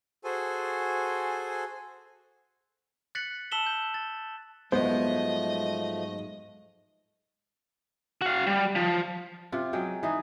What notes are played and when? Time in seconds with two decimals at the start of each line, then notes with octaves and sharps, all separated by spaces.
0.24 F#4 G#4 A4 C5 G#5
3.15 F#6 A6 B6 C#7 F#7
3.52 A5 E6 B6 E7 F#7 G7
3.66 G6
3.94 A6
4.72 G#2 F3 F#3 G#3 A3 B3 C5 D#5
8.21 F#4 F5
8.47 G3
8.75 F3
9.52 C3 F4
9.73 F#3 G#3 G5
10.03 E3 D#4 G#4